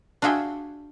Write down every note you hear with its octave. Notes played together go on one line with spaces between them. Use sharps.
D4 F4 F#4 G#4 E5 G5